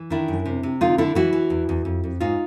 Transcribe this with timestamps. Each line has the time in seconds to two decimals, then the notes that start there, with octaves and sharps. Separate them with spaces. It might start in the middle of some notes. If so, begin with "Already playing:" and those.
Already playing: E3
0.10 D#3 D4 E4
0.28 F#2
0.45 C3
0.63 C3
0.81 D3 D#4 F4
0.98 D3 D4 E4
1.15 E3 E4 F#4
1.33 E3
1.50 E2
1.69 E2
1.85 F2
2.04 F2
2.20 G#2 D#4 F4